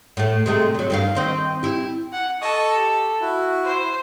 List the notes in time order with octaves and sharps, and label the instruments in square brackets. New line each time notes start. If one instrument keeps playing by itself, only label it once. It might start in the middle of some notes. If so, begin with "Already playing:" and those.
[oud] A2 A3
C3 G#3 A3
D3 F#3
G2 D#3 F5
D#3 C4 D#4
G3 E4
[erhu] F#5
[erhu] A4 [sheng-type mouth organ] D#5 C#6 D#6
[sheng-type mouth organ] G4
E4 F#4
[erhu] C5